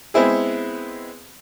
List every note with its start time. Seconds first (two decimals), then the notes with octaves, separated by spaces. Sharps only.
0.14 G#3 B3 C4 E4 G#4